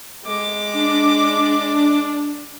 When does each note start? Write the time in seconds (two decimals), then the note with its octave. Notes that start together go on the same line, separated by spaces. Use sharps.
0.25 G#3 D6
0.73 D4